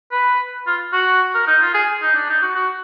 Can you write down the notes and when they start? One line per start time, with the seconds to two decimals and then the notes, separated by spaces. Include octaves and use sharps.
0.12 B4
0.67 F4
0.93 F#4
1.34 A#4
1.47 D#4
1.62 F4
1.74 G#4
2.02 D#4
2.16 D4
2.29 D#4
2.42 F#4
2.56 F#4